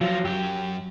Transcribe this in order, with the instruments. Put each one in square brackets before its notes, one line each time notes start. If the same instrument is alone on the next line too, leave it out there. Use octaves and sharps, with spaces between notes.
[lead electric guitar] F3 [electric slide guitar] F#3 F4
[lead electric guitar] F#2 F#3 [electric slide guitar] G4